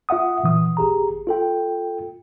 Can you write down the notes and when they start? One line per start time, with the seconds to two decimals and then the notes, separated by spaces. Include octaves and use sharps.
0.09 F4 E5 F#5 D#6
0.43 A#2 E3 D#6
0.77 G#1 G4 G#4 A#5
1.27 F4 A4 G5